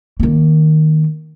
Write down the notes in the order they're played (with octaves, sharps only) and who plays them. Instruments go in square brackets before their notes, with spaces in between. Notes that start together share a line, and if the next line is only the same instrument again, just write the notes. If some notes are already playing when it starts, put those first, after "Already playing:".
[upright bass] D#3 A#3